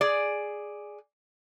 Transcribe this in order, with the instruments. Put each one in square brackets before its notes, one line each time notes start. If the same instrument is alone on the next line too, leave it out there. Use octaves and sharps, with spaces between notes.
[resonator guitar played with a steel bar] G#4 D5